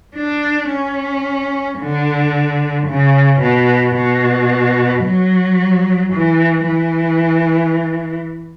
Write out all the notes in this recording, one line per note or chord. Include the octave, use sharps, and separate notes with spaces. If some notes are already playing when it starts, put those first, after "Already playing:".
D4
C#4
D3
C#3
B2
B2
F#3
E3
E3